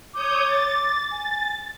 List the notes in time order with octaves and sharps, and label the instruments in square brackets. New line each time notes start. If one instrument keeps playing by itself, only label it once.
[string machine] C#5 D#6 G6 [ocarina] D6
[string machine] A6
[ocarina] G#5